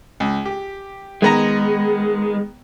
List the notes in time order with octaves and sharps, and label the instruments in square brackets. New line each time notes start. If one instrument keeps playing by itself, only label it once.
[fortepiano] C#2
G4
[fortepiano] D#3 B3 A#5 [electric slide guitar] G#3